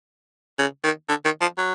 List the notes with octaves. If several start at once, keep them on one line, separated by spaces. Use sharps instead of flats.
C#3
D#3
D3
D#3
F3
F#3